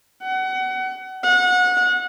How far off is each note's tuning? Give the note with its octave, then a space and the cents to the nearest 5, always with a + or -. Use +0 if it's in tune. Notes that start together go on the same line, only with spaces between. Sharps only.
F#5 +30
F#5 -25